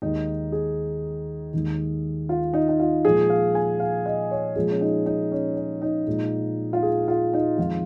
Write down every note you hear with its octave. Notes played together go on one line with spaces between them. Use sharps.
D#2 D#3 G#3 D#4
G#4
D#2 D#3 G#3
F4
D#4
D#4
F4
A#2 F3 G#3 G#4
F5
G#5
F5
D#5
C#5
A#2 F3 G#3 G#4
C#4
D#4
D#4
C#4
C#4
D#4
A#2 F3 G#3
F4
G#4
F4
D#4
F2 D#3 G#3 F4